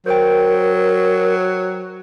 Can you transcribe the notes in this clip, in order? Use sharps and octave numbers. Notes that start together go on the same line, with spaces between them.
F#3 A#4 C5 G5